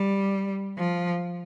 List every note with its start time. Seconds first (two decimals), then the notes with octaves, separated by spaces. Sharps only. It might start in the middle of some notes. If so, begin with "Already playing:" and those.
Already playing: G3
0.77 F3